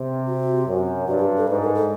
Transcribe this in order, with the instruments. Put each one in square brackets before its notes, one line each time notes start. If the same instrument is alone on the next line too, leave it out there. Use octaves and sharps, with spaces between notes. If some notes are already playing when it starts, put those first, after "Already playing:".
Already playing: [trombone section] C3
[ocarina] F#4
[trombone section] F#2
[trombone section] G2 [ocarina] F#4
[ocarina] G4
A4
[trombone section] G#2 [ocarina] B4
[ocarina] A#4
A4